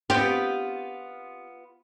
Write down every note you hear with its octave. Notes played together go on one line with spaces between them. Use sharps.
B3 C4 F4 G4